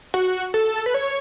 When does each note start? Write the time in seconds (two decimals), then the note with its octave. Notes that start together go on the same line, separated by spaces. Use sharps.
0.14 F#4
0.54 A4
0.86 B4
0.94 C#5